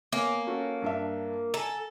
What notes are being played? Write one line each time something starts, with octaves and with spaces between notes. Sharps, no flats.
A#3 B3 C#5 G#5
C#4 F#4 A4
G2 D4 E5
A4 G#5 A#5